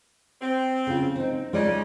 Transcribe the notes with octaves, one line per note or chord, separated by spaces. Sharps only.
C4
C#3 F4
C4 D#4
C#3 G#3 D#4 F4 D5